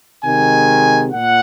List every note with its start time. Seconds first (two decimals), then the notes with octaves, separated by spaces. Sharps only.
0.23 C3 D#3 G#3 G#5
1.12 A#2 F#5